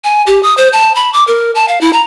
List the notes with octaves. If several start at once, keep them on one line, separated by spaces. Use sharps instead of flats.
G#5
G4
D#6
C5
A5
B5
D6
A#4
A5
F5
E4
A#5